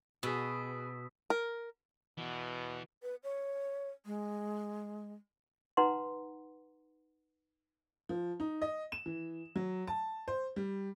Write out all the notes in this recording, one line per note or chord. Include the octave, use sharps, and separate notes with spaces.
B2 F#4 G#4 D#6 E6 B6
A#4
B2 E3 B3
B4
C#5
G#3
D#4 B4 F#5 A#5 C6
F3
D#4
D#5
E7
E3
F#3
A5
C5
G3